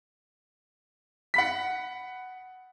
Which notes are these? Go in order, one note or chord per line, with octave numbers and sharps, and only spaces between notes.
F#5 B5 B6